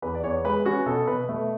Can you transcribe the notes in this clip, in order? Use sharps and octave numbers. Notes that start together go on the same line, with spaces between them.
E2 B4
D5
E2 C#5
G#3 B4
C#4 F#4
B2 A4
B2 B4
A3